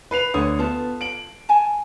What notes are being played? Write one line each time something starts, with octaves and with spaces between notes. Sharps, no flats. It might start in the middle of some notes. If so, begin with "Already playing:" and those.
B4 C7 F7
D2 D3 C5 C#5 D#6
B3 F4 A4 A5
D7 F#7
G#5 A5